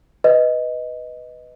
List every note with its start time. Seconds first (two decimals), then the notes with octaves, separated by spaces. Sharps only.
0.24 B4 D#5